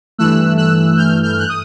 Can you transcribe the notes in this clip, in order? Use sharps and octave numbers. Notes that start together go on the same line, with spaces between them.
G2 E3 A3 E6 F#6
E6 F#6
F6 G6
F6 G6
F#6
D#6